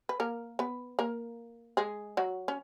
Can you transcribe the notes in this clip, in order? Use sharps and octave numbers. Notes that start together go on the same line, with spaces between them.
B4
A#3 A#4
B3 B4
A#3 A#4
G#3 G#4
F#3 F#4
C#4